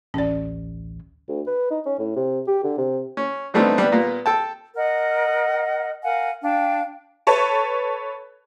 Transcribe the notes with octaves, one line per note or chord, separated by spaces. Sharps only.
A1 D2 C#4 D5
D2
B4
D#4
C#4
A2
C3
G4
D3
C3
C#4
D3 G3 A3 B3 C4 D#4
G3 B3
A#2 A#3 B3
A4 G5 A5
A#4 D#5 F#5
A#4 F5 F#5 G#5
D4 F5 G5
A4 B4 C#5 A5